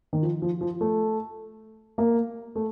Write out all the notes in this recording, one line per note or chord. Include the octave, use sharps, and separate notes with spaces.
D#3
F3
F3
F3
A3
A#3
A3